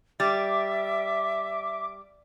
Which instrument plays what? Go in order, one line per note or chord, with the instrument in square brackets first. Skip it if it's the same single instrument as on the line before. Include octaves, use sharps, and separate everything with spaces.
[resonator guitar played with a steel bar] G3 [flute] E5 [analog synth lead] D6 [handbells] A6